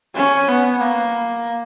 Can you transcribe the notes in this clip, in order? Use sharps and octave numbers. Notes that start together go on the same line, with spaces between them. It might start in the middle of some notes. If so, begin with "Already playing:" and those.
C#4
B3
A#3